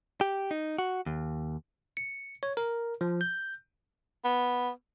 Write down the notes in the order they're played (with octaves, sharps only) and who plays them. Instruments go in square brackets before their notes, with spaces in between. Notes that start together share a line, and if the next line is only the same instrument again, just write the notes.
[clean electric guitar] G4
D#4
F#4
D#2
[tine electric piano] C#7
C#5
A#4
F3
G6
[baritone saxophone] B3